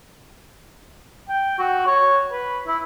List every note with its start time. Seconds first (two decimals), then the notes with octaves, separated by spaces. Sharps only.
1.29 G5
1.59 F#4
1.87 C#5
2.31 B4
2.67 E4